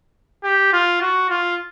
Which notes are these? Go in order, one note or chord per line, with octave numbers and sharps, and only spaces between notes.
G4
F4
F#4
F4